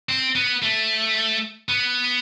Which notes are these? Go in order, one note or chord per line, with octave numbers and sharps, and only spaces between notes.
C4
B3
A3
B3